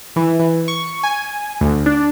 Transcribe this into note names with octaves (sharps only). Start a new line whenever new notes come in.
E3
E3
C#6
G#5
D2
D4